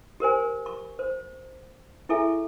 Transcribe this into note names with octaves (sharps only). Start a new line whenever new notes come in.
G4 A#4 C5 G#5
C#6
C5
E4 G#4 A4 E5 G#5